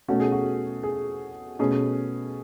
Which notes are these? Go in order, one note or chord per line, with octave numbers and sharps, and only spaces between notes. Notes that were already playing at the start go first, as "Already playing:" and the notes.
B2 A3 C#4 F#4
G#4
F#4
G#4
B2 A3 C#4 G#4